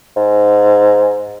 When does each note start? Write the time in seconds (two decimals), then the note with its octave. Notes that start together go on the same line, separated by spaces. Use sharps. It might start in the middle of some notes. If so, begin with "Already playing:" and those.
0.16 G#2